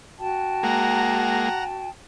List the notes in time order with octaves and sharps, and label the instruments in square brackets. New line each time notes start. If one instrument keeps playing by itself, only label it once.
[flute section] F#4 G5 A5
[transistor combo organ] G#3 A#3 [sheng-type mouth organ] F#5 A#5